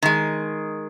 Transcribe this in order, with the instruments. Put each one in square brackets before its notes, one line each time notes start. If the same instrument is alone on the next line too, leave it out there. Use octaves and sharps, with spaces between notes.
[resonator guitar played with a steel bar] D#3 G#3